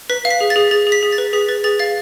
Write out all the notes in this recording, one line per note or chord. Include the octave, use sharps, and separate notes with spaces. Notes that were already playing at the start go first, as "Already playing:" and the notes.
B4 B6
F5
B6
G#4
A6
G#4
G#4 A6
G#4
B6
G#4
A6
B4
G#4 B6
B4 A6
G#4 A6
F5 A6